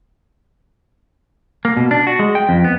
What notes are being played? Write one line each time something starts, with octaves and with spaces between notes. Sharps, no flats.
A#3
B2
D4
F#4
G#3
G5
F2
B3